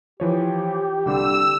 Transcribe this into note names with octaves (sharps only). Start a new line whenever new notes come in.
E3 F3 G4 C#5
C2 D3 G3 E6